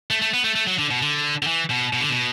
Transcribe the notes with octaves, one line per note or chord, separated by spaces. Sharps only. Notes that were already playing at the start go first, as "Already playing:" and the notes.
A3
A3
B3
A3
A3
F#3
D3
B2
D3
D3
E3
B2
B2
D3
B2